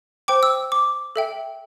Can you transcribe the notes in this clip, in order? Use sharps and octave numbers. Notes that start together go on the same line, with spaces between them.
C5 G5 D6
E6
D6
A4 E5 G5